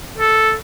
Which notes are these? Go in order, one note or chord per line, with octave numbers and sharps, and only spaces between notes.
A4